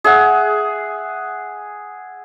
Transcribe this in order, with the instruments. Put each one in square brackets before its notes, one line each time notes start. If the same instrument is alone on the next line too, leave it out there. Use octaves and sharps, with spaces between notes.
[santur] G#4 E5 F#5